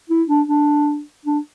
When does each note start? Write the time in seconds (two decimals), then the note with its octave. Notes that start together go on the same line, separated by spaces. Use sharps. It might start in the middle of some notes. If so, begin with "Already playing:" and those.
0.09 E4
0.28 D4
0.47 D4
1.26 D4